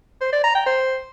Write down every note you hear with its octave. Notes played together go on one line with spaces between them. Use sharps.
C5
D5
A#5
G5
C5